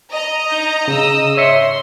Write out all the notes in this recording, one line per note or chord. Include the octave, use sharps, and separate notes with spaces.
D#5 A#5
D#4 G6
C#3 D#6 E6
C#5 E5 C6 C#7